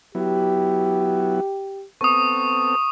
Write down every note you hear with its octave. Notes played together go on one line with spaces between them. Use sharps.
F#3 B3 E4 G4
B3 C4 A4 C#6 D#6